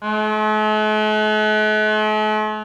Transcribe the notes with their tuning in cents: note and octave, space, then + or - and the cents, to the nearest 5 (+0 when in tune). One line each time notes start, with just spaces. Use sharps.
A3 -45